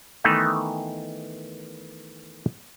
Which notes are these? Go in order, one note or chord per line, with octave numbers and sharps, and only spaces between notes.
D#3 E3 A3 B3 D#4